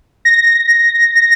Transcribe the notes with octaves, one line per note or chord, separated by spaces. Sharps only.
A#6